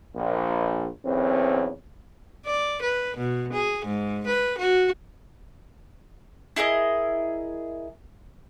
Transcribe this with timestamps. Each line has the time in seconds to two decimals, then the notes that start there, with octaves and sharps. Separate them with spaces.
0.16 A#1
1.06 B1 E2 C4 C#4
2.46 D5
2.82 B4
3.17 B2
3.53 G#4
3.85 G#2
4.27 B4
4.58 F#4
6.56 E4 G#4 A#4 D#5